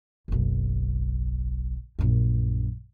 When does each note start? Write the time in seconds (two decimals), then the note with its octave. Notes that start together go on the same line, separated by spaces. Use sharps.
0.28 F#1 B1
1.99 A#1 F#2